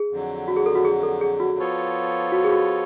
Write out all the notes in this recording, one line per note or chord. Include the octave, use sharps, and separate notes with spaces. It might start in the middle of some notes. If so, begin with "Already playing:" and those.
Already playing: G#4
F2 D3 F#3
F#4
G#4
A4
F#4
G#4
A4
G#4
F#4
F3 B3 F4 A4 C#5
F#4
G#4
F#4